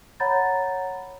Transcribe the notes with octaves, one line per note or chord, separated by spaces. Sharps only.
C#5 F#5 A#5 B5 G6 A6